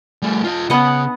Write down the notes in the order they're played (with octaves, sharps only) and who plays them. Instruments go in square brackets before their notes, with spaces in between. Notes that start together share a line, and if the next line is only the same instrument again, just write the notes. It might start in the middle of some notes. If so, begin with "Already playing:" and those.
[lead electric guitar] G3 A3
F4 D#5
[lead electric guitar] C#3 [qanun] B3 D#5 F#5